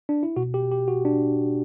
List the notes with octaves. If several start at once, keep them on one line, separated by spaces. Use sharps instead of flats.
D4
E4
B2 F#4
G4
G4
F#4
D4